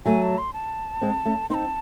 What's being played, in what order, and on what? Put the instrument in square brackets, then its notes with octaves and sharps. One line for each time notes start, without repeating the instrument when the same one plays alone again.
[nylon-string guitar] F#3 A3 [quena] G#5
[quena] A5
C6
A5
[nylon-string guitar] G#3 C4
A3 C#4
[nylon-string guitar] C4 D#4 [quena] A5 C6